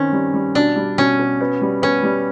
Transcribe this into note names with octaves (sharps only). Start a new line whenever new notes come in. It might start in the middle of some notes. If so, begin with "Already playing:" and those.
Already playing: D#3 C4 C#4
G3
G3
B2 D4
G3
B2 C#4
B2
B3
G3
B3 C#4
G3